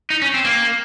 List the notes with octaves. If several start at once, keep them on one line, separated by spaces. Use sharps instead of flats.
D#4
C#4
C4
A#3